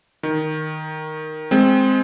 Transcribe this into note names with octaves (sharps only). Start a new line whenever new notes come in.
D#3
G#3 C4